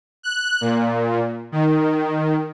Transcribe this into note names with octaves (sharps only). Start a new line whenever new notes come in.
F#6
A#2
D#3